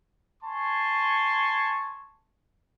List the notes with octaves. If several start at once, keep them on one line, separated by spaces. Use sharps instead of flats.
G#5 A5 C6 C#6